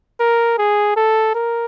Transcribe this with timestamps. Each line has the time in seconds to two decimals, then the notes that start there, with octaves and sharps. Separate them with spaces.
0.20 A#4
0.58 G#4
0.97 A4
1.35 A#4